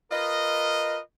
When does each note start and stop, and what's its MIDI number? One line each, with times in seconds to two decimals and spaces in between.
0.12 0.99 65
0.12 0.99 70
0.12 0.99 71
0.12 0.99 75